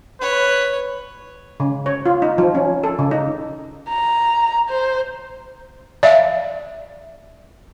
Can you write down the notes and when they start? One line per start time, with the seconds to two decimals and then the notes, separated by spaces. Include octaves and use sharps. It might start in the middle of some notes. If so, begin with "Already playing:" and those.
0.21 B4 C#5
1.60 C#3
1.86 C#5
2.06 F4
2.22 D#4
2.38 F3
2.55 C#4
2.84 A4
2.99 C#3
3.11 D#4
3.89 A#5
4.70 C5
6.03 D5 E5 F5